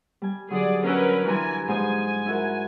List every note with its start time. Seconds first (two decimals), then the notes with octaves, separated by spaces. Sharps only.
0.22 G3 G#5
0.50 D3 F#3 G#4 D5
0.84 C#4 D4 A#4 B4 F#5 E6
1.27 E3 G3 G#5 A#5 C6
1.68 G#2 F3 D#5 G#5
2.26 E4 F#4 A#4